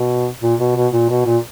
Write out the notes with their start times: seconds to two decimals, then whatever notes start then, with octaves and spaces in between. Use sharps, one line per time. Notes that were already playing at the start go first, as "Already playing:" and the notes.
Already playing: B2
0.43 A#2
0.60 B2
0.76 B2
0.93 A#2
1.09 B2
1.26 A#2